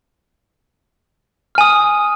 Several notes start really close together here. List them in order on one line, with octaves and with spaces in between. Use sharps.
F6 G#5 D#6